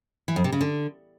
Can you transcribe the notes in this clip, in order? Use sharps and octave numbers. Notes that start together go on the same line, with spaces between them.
E3
F2
C3
C#3
D3